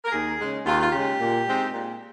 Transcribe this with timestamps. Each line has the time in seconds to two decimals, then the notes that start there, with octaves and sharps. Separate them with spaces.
0.05 A#4
0.12 D#2 G#4
0.39 C#3 G#3
0.66 D#2 F4
0.81 F4
0.92 C#3 G#3 G4
1.20 A#2
1.46 G#3 C4 D#4
1.73 A#2